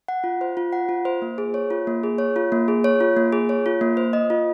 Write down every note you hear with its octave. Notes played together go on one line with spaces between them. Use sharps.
F#5
F4
C5
F4
F#5
F4
C5
A#3
G#4
C#5
F4
A#3
G#4
C#5
F4
A#3
G#4
C#5
F4
A#3
G#4
C#5
F4
A#3
C5
D#5
F4